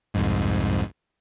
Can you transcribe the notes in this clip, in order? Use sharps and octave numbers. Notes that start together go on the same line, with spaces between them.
C2 F2 G#2